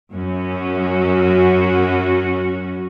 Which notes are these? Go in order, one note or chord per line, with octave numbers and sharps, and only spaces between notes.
F#2 C#4 F#4